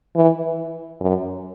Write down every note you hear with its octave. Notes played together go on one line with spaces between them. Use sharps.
E3
F#2